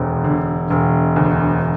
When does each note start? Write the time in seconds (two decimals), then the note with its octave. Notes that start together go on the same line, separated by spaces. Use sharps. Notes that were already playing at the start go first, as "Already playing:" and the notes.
Already playing: E1 D2
0.24 D3
0.70 E1
1.16 D2